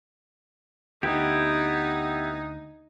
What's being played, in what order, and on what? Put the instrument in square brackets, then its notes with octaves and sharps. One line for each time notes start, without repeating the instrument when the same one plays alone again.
[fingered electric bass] D2 [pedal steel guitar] B3 E4 G4 [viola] D#4